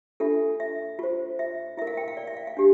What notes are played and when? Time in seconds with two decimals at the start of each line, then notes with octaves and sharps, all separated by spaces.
0.20 D4 F4 A4 E5
0.60 E5
0.99 F4 C5
1.39 E5
1.77 E4 E5
1.82 A#4
1.87 F5
1.97 G5
2.08 F5
2.17 D5
2.27 E5
2.37 F5
2.47 F5
2.57 D4 G4